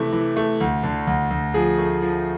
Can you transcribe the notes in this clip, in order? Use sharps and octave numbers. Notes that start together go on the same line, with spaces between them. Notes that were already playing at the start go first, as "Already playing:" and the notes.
Already playing: C3 E3 A3
E3
A3
D2
D3
D2
D2
F3 G#4
A3
F3